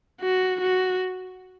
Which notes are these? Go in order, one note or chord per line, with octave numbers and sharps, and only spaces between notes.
F#4
F#4